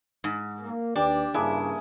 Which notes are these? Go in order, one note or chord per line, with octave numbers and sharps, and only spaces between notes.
G#2
A#3
D#2 D4 G4 B4 D5
G2 C#3 A#3 D4 E4 G#4